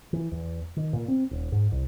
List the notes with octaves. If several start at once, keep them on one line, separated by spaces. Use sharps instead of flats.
E3
E2
D#3
A#2
C4
D#1
G#2
C2